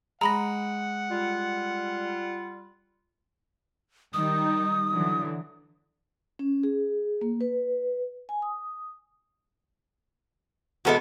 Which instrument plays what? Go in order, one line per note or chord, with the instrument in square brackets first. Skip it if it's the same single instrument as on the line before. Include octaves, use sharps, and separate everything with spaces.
[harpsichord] G#3 [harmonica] F#5 [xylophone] A#5 B5 A#6
[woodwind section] G3 F4
[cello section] D#3 G3 D#4 [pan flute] D#6
[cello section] D3 E3 F#3
[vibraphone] C#4
G#4
A#3
B4
G#5
D#6
[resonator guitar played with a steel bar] E2 B2 A4 [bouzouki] G#3 B3 F#4